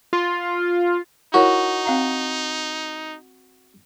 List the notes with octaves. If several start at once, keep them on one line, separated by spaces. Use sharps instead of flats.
F4
D#4 E4 F#4 A#4 C#5
C4 F5 A#5